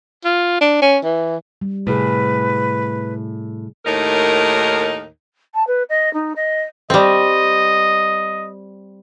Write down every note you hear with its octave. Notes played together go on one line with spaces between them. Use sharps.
F4
D4
C#4
E3
G3
A2 C3 G#4 B4
D#2 A2 D#4 A#4
A5
B4
D#5
D#4
D#5
G3 C4 D#5